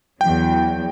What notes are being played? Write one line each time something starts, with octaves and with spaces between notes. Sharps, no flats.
E2 F#3 G5